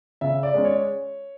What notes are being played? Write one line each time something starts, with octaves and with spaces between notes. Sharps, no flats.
C#3 E5
D5
G#3 C#4
C#5